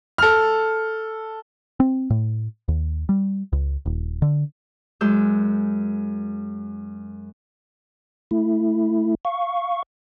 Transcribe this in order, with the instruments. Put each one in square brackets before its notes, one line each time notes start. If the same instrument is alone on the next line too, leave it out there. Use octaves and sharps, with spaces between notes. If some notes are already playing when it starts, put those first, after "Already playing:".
[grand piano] A4 F6
[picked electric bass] C4
A2
D#2
G3
C#2
D#1
D3
[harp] F#2 G#3 E6 G6
[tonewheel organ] A3 E4
F5 C#6